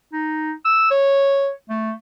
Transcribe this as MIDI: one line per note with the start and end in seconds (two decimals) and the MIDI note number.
0.13 0.52 63
0.65 0.87 88
0.91 1.50 73
1.70 1.92 57